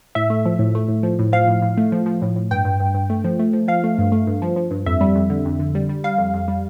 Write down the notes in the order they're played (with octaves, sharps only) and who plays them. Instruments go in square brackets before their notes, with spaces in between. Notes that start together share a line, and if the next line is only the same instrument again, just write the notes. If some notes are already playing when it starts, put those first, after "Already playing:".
[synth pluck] A2 E5
A3
F3
A2
A3
A2
F3
A2
F3 F5
A2
A2
A3
F3
F3
A2
A2
G2 G5
G2
G2
G2
A3
F3
A3
F3
F3 F5
A3
G2
A3
G2
F3
F3
G2
F2 E5
G3
F2
D3
F2
D3
G3
G3
G3 F5
F2
F2
G3